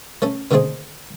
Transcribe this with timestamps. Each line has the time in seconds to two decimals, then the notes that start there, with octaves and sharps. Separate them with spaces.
0.22 A3 C#4 A4
0.51 A#2 D3 D#3 A3 C4 G#4